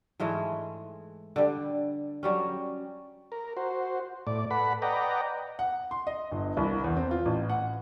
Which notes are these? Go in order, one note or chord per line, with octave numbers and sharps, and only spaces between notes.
G#2 E3 G#3 A3
D3 G3
F#3 G3 C#4
A#4
F#4 C5
A2 D5
A4 B4 F#5 B5
B4 D5 D#5 F#5 G5 A#5
F#5
C6
D#5
G1
C2
E2
C4
F4
A1
F#5